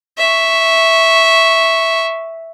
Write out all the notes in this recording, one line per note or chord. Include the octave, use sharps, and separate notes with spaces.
E5 C#6